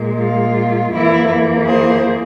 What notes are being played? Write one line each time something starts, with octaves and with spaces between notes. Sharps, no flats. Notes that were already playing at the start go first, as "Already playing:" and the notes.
Already playing: A#2 G#3
F4
F2 E3 A#3 E4
G#4 C5